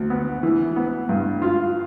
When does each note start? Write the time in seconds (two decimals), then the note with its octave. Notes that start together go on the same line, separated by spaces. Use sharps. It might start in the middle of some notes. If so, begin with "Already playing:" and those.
Already playing: D2
0.10 B3
0.43 E3
0.76 B3
1.09 G2
1.42 F4